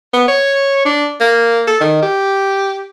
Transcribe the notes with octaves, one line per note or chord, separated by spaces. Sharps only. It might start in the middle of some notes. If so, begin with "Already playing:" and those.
B3
C#5
D4
A#3
A4
D#3
G4